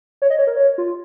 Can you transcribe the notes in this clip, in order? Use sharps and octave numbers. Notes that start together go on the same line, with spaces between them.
C#5
D#5
C#5
A#4
C#5
F4